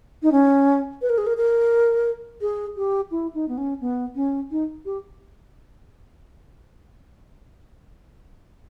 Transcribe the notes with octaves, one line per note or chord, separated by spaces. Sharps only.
D#4
C#4
B4
A#4
G#4
A#4
A#4
G#4
G4
E4
D#4
B3
C#4
B3
C#4
D#4
G4